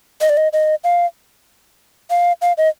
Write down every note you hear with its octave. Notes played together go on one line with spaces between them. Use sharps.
D#5
D5
D#5
D#5
F5
F5
F5
D#5